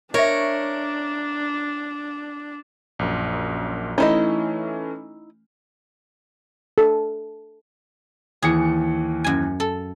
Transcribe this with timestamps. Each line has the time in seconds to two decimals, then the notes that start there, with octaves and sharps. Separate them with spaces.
0.14 D4 A#4 C#5 D#5 E5
2.99 A#1 F#2
3.98 E3 A3 C#4 D#4 E4 D#5
6.78 A4
8.42 D#2 E3 G#4 C#7
9.24 F#2 G#5
9.60 A4